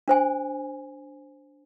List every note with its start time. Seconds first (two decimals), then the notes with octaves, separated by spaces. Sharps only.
0.08 D4 C5 G#5